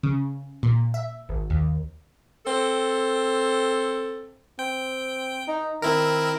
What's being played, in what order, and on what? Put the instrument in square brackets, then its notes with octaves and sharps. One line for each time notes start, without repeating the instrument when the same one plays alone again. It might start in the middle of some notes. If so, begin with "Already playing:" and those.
[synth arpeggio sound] C#3
A#2
E5
G#1
D#2
[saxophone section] C4 A4
[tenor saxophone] C4 [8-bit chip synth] G5
[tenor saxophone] D#4
[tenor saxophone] D#3 [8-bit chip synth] C4 E4 A#4